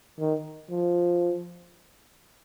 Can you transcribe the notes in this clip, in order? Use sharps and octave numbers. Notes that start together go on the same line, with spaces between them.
D#3
F3